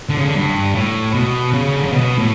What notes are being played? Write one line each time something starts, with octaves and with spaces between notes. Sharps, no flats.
D3
C#3
D3
G2
A2
B2
C#3
D3
C#3
B2
A2